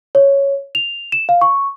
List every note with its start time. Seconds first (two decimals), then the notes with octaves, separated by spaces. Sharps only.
0.15 C#5
0.75 F7
1.12 E7
1.29 F5
1.41 C#6